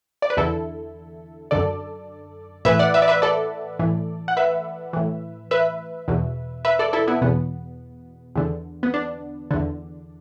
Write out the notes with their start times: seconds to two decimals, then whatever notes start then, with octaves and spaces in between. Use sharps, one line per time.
0.22 D5
0.30 B4
0.37 E2 D3 E4 A4
1.51 F#2 D3 A4 D5
2.65 A2 E3 B4 E5
2.79 D5 F#5
2.94 B4 E5
3.02 D5
3.08 B4 E5
3.22 A4 D5
3.79 A2 E3
4.28 F#5
4.37 B4 E5
4.93 A2 E3
5.51 B4 E5
6.08 E2 B2
6.65 B4 E5
6.79 A4 D5
6.93 E4 A4
7.07 B3 E4
7.22 E2 B2 B3
8.36 E2 D3
8.83 B3
8.94 D4
9.51 E2 D3